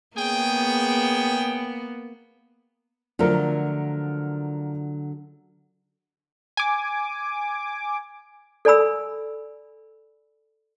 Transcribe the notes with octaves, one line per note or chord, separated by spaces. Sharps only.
C#3 A#3 B3 G#4 G5
D3 F3 F#3 A3 A#4
G#5 D6
A4 D5 G#5 B5 E6